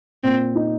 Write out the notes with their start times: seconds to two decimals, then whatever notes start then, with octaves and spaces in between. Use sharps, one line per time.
0.24 A#2 C4
0.55 D#4